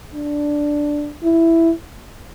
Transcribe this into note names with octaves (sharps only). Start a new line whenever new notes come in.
D4
E4